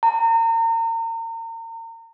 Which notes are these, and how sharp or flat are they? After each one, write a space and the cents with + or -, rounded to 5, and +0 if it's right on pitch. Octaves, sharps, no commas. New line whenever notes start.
A#5 -35